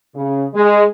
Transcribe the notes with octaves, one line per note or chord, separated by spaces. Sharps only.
C#3
G#3